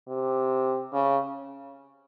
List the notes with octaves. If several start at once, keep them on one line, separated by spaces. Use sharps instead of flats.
C3
C#3